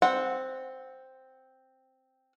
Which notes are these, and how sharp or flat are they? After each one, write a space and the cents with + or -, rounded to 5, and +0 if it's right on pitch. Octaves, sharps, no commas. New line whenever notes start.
C4 +0 F#5 -10